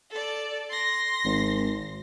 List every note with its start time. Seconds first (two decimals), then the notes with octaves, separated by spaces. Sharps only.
0.11 A4 D5
0.70 C6 A#6
1.25 G#1